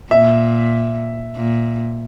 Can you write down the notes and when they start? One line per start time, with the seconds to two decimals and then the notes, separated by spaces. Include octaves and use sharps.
0.11 A#2 E5
1.36 A#2